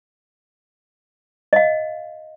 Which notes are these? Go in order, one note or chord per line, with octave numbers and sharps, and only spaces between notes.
D#5 F5